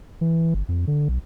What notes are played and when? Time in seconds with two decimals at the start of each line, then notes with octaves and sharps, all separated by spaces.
0.21 E3
0.54 G1
0.68 F2
0.87 D3
1.09 B1